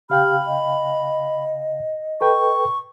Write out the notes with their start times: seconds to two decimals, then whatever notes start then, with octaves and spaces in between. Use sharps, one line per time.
0.10 C#3 G4 F5 G5 B5 F6
0.47 D#5
2.21 A4 B4 G5 C#6